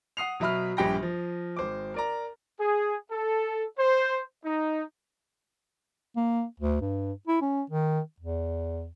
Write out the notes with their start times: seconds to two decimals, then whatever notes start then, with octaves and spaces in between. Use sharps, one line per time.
0.17 F#5 D#6 C7 F7
0.40 B2 F#3 E5 B5 F6
0.77 A#1 G2 G4 G5 B5 A#6
1.03 F3
1.57 G#1 C5 D6
1.94 A#4 D5 A#5
2.60 G#4
3.11 A4
3.78 C5
4.44 D#4
6.17 A#3
6.60 D2
6.81 G2
7.27 E4
7.42 C#4
7.70 D#3
8.21 E2